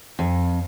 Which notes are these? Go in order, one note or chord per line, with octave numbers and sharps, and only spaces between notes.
F2